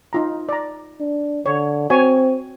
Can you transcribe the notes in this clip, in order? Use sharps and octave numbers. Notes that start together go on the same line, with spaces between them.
D#4 F4 A#5
D5 A#5
D4
D3 C#5
C4 F#4 C#5 G#5